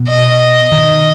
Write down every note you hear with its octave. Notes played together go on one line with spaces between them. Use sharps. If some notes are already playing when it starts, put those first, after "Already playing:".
Already playing: B2
D#5
D#3